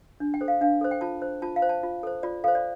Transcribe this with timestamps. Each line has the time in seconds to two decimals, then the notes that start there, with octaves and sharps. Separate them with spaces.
0.20 D4
0.34 G5
0.41 A4 C5
0.48 F5
0.61 D4 F5
0.81 A4 C5
0.91 G5
1.01 F4 A5
1.22 C5
1.42 F4 A5
1.56 F5
1.62 C5
1.69 A5
1.83 F4
2.03 A4 C5
2.23 F4 D5
2.44 A4 C5 F5
2.55 D5